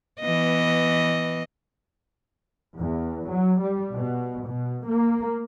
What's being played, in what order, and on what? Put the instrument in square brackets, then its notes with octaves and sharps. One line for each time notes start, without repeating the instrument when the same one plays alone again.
[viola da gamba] E3 B3 D#5
[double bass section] E2
F#3
G3
B2
B2
A#3